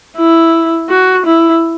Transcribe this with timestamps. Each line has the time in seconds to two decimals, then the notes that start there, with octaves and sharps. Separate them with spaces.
0.17 E4
0.90 F#4
1.26 E4